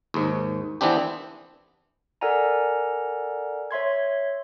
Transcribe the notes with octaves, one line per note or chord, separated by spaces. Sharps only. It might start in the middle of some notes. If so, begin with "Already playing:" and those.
D#2 G#2
E3 B3 C4 D4 G4
A4 A#4 D5 F#5 G#5 A#5
C#5 E5 C6 G#6